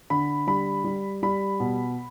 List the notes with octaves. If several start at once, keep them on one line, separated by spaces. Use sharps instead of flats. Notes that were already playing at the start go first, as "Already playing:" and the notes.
D3 B5
G3 B5
G3
G3 B5
B2